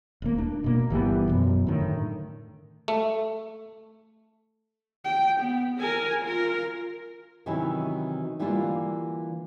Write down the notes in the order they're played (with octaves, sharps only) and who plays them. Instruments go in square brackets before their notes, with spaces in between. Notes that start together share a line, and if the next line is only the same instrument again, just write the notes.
[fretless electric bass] D#1 A#3
D4
B2 A#3
G1 E3 G3 B3
F#2 B2
A2 D3 D#3
[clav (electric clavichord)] A3
[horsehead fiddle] G5
B3
A#4 G#5
F4 A#4
[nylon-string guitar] C3 D#3 E3 F#3 C#4 E4
D3 E3 G3 A#3 F4